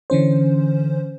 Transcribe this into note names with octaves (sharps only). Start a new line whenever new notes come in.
D3 E3 C#4 C5